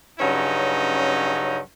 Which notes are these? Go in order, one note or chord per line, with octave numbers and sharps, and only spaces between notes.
G2 C#3 F#3 C#4 D#4